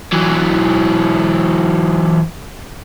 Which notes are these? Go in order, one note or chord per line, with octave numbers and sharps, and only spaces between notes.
E3 F#3